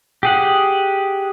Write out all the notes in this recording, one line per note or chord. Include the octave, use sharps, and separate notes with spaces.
G4 G#4 F#5